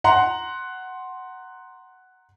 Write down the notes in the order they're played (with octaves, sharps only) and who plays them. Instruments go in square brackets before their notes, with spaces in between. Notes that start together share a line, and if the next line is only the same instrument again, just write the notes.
[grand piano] F#5 A#5 C6